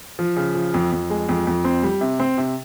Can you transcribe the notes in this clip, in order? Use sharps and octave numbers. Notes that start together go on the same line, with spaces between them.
F3
C#3
F3
F2
F2
G#3
F2
F2
C4
G3
C3
C4
C3